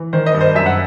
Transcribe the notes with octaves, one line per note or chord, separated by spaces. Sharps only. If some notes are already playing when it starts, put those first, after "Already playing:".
Already playing: E3
D#3 C5
D#5
G2
C5
F#2 E5
F#5